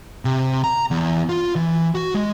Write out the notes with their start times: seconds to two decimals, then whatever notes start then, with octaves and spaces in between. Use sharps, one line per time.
0.25 C3
0.64 A#5
0.91 E2
1.29 F4
1.55 E3
1.95 F#4
2.14 G#3